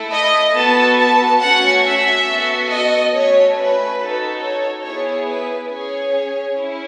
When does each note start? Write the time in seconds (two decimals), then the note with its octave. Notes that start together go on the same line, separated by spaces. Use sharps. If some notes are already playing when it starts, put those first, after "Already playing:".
Already playing: A3 E4 A4
0.13 D#5
0.55 B3 F#4 A4 A5
0.98 A5
1.41 A3 C#4 F#4 F#5
1.83 E5
2.27 B3 F#4 A4
2.70 D#5
3.13 A3 C#4 F#4 C#5
3.55 B4
3.98 D#4 F#4 A4
4.40 C#5
4.83 B3 E4 G#4 C#5
5.26 B4
5.68 C#4 G#4 C#5
6.55 C#4 E4